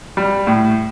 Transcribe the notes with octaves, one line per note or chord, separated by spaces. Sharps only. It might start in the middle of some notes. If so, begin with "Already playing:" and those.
G3
A2